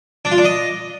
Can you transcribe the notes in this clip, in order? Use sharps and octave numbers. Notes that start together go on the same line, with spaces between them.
D4
F4
D4
D#5